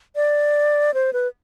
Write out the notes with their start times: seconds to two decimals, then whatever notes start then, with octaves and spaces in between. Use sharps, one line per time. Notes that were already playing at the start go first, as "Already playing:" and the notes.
0.16 D5
0.94 C5
1.13 B4